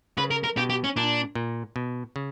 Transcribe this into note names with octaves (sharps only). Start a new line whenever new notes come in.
C#3 B4
A#4
A#4
B2 G4
G4
C#4
A#2 D4
A#2
B2
C#3